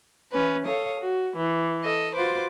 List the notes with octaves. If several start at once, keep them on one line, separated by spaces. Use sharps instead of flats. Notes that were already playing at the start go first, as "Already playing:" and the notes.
E3 C#4 B4
A4 C#5 F5 D#6
F#4
E3
A4 D#5 E6
F4 F#4 B4 C5 D6